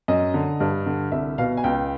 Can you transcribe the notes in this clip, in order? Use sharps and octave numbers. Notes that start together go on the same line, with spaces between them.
F#2 D#5
D3
G2
D3
C2 E5
B2 F5
G#5
C#2 G5